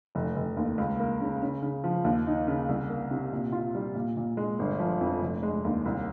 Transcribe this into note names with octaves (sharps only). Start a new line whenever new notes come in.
F1
F1
D#2
C#2
A#3
C#3
C#3
C#3
F3
D#2
D#4
C#3
C2
A#3
C3
A#2
F4
G3
A#2
A#2
G#3
G1
F3
F2
F1
G#3
D#2
C2